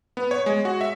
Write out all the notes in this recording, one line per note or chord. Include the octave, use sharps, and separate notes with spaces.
B3
C#5
G#3
F#4
E5